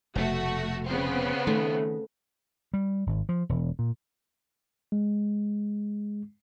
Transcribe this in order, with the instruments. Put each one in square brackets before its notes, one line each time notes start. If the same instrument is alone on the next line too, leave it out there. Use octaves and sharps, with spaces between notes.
[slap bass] F1 B2 [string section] A3 F#4
[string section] C#3 B3 C4
[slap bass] D#3 [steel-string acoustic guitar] A3
[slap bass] G3
G#1
F3
E1
A#2
[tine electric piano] G#3